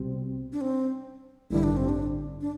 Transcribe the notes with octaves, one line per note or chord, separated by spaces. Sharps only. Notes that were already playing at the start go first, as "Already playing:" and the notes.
Already playing: C2 B2 G3 C4
D4
C4
A1 G2 D3 G3 E4
D4
C4
D4
D4